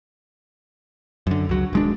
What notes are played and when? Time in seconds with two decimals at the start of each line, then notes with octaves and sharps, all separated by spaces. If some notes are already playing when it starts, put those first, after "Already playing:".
1.27 F#2 D3
1.49 C#2 F#3
1.73 D#1 G#3 D4